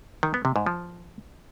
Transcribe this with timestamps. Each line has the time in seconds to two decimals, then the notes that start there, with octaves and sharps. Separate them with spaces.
0.23 D#3
0.34 B3
0.45 C3
0.56 G#2
0.66 F3